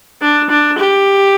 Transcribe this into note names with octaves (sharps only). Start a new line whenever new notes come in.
D4
D4
G4